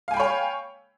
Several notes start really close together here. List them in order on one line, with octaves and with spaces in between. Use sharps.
F5 G#5 G5 B5 C#5